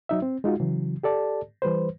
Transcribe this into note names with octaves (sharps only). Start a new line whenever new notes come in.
F#3 D#4 E5
C4
G#3 D#4 F4 F#4
C#3 E3 F#3
G4 A4 D5 A5
E3 G3 B4 C5